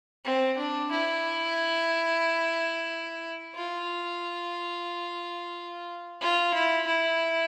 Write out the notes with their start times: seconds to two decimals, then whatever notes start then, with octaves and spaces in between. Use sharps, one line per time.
0.25 C4
0.57 D4
0.91 E4
3.55 F4
6.21 F4
6.54 E4
6.87 E4